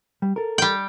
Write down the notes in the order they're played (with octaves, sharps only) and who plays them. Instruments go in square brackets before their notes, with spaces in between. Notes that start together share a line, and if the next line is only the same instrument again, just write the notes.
[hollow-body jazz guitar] G3
A4 A#4
[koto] G3 G5